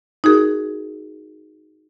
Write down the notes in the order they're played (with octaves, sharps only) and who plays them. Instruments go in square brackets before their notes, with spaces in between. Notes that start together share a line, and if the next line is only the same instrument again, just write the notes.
[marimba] D#4 F#4 G#4 A#4